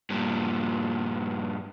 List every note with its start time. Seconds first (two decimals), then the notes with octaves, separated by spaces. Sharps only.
0.10 G2 A#2